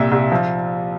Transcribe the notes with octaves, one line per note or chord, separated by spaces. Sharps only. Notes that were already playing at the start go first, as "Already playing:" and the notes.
Already playing: C2 A#2 E5
C2
F3